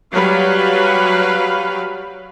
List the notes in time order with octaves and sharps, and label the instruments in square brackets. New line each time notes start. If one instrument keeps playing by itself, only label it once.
[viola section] F#3 G3 B4 F5